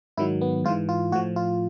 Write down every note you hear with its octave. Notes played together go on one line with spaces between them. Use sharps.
G#2 D#3 F#3 E4
B3
G#2 E3 F4
F4
A2 F3 F#4
F4